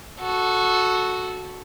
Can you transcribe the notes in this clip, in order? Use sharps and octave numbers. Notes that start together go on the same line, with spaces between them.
F#4 A4